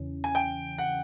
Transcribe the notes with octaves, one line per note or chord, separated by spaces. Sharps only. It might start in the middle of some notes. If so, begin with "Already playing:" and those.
Already playing: E2 C#3 E3 C#4
G#5
G5
F#5